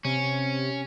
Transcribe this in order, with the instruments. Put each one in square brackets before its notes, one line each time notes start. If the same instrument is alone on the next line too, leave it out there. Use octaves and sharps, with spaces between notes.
[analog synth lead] C3 [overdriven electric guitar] C#4